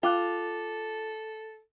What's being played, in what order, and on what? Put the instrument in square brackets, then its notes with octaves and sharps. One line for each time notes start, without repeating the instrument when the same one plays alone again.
[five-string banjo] F4 [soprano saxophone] A4 [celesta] G5 D6 F#6